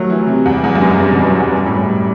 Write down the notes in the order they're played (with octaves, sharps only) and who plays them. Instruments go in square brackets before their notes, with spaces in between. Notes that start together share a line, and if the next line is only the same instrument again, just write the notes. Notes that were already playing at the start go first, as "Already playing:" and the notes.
Already playing: [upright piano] D#3 F#3 G3 [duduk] A3
[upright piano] E3
C3
[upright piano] E2 [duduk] G3
[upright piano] E2
[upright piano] G2 [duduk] F#3
[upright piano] F#2
G2
[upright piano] B2 [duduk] E3
[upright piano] F#2 [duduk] F#3
[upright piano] E2 [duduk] G3
[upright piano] F#2 [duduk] G3
[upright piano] A2
F#2